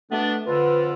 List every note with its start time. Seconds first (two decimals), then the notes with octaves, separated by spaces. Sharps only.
0.11 B2 A3 B3 D4
0.47 F2 D3 F4 B4